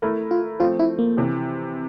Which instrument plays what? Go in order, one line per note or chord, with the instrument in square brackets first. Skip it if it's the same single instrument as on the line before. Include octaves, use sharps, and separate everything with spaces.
[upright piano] A3 E4 A#4
[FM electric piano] F4
[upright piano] F3 A3 C4 [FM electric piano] F4
[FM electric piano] E4
A#3
[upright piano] C3 E3